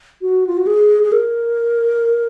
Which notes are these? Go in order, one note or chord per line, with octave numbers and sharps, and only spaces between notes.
F#4
F4
F#4
G#4
G#4
A#4